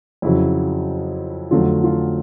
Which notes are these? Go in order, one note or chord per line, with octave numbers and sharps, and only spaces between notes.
F2 C#3 F#3 E4
F2 D3 F#3 A3 F4
F4